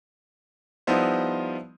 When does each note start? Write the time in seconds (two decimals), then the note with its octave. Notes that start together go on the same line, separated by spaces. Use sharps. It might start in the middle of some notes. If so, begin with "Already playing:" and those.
0.87 F3 G3 B3 D#4 E4 C5